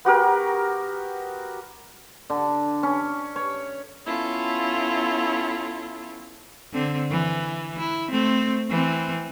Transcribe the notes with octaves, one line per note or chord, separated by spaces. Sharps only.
B3 F#4 G4 A#4
D3
C#4
C#5
B3 C#4 E4 F4 A4
D3 C4
E3
E4
A3 C4
E3 C4